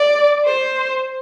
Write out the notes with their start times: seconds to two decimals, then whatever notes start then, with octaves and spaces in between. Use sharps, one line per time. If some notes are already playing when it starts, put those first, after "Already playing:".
Already playing: D5
0.46 C5